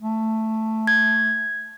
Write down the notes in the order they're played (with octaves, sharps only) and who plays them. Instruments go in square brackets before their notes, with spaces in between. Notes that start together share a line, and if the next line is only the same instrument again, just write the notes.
[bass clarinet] A3
[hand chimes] G#6